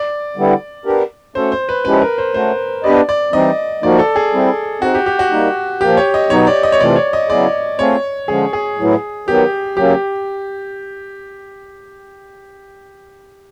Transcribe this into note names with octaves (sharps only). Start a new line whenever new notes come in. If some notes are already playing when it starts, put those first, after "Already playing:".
Already playing: D5
D3 G3 B3 E4
B3 D4 G4 A#4
A3 C#4 F#4 A4 C5
C5
B4
F3 G#3 C#4 E4 G4 B4
A#4
C5
A3 C#4 F#4 C5
B3 D4 G4 B4 D5 D#5
D5
E3 G3 C4 D#4 D#5
F3 A#3 D#4 F#4 D5
A4
G#4
G3 C4 E4
C4 D#4 F#4 G#4
G4
G4
F#4
G3 A#3 D#4
A#2 F3 A#3 G4
C#5
D#5
B2 F#3 B3 D#4 C#5
D5
D#5
C#5
C3 E3 A3 C4 F4 D5
C#5
D#5
C#3 F#3 B3 E4 G#4 D5
A3 C4 F4 G#4 C#5
D3 F3 G#3 C#4 G#4
G#4
A2 F#3 B3 E4
D#3 F#3 B3 G4
C#3 F#3 A#3 C#4 G4